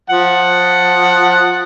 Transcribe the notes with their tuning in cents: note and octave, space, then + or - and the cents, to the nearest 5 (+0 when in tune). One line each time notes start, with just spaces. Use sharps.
F3 +20 F#5 +0